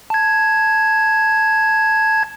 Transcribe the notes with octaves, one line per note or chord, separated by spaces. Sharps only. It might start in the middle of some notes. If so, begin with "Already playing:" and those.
A5 G#6